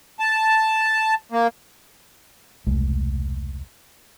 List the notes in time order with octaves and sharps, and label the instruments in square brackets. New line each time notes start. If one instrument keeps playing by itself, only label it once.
[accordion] A5
A#3
[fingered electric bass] E1 C2 G#3 A3